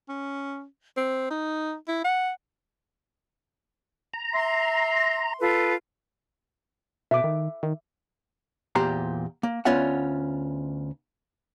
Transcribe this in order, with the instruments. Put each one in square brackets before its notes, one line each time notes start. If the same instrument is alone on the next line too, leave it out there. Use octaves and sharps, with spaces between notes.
[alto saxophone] C#4
C4
D#4
E4
F#5
[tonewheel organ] A#5
[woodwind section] E5 C6
[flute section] F4 A4 B4
[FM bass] B2 [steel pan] E5 D6
[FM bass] D#3
D#3
[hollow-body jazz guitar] E2 A#2 G4 C5 A#5
A#3
D2 B3 C#4 F4 E5 F#5